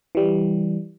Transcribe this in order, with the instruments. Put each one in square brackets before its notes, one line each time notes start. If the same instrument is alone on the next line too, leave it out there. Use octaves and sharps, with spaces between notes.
[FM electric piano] E3 G3